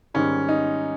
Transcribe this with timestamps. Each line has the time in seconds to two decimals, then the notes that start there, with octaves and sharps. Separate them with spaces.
0.14 G#2 D#3 G3 C#4
0.48 D#4